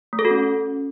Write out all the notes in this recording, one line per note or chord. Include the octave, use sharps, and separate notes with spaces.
A3
A4
F#4
C#4